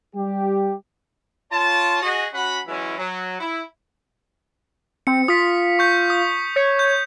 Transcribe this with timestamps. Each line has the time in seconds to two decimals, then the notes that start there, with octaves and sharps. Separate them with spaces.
0.14 G3 G4
1.52 F4 C#5 A5
2.02 F#4 G#4 D#5
2.34 C#4 F#4 F#5 B5
2.66 E3 F#3 G#3 C#4 E4
2.98 F#3
3.40 E4
5.07 C4 C#7
5.28 F4 D#6 B6
5.79 C#6 G6 B6
6.10 D#6
6.56 C#5
6.79 G6